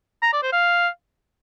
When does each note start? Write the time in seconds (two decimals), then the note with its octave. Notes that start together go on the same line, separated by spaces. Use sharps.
0.22 A#5
0.32 D5
0.43 C5
0.53 F5